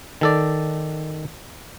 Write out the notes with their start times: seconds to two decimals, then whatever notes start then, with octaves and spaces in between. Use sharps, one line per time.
0.21 D#3 A4 D5